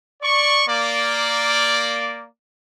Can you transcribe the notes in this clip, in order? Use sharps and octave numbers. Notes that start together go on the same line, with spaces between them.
D5 C#6
A#3 D5